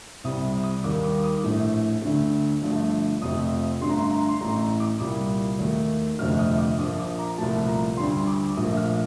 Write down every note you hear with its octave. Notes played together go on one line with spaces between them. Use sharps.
C2 C3 G3 D#6
D#6
D#2 D#3 G3 D6
D6
D6
D#6
A#1 A2 A3
D2 D3 A3
G1 G2 F3 A3
F2 C3 F3 A3 D#6
G1 G2 D3 A3 C6
A#5
C6
A#5
C6
A1 A2 A3 A#5
A#5
D6
C2 A#2 G3 D#6
D#2 D#3 A3
G1 F2 C3 F3 A3 F6
D#6
D6
A#1 A#2 F3 D#6
D6
A#5
C2 A#2 F3 A3 A5
A#5
D2 D3 G3 C6
D6
A#1 A#2 F3 A3 D#6
F6